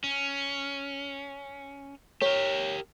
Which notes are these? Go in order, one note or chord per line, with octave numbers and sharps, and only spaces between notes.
C#4
G4 A#4 C#5